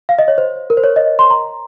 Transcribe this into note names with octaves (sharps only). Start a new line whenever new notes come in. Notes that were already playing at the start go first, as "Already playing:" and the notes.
F5
D#5
C#5
C5
A#4
C5
C#5
D#5
C6
A#5